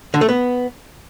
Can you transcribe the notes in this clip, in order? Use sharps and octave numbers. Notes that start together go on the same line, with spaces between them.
D3
A3
B3